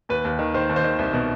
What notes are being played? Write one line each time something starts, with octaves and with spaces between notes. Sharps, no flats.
D#2 B4
D#2
D#3
D#3 C5
D#2
C5
D#3
C2
B2